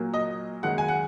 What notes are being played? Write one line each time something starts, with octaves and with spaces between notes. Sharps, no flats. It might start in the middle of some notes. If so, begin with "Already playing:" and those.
Already playing: A#2 F#3 A#3
D#5
F#2 D#3 G#3 F#5
G#5
F#5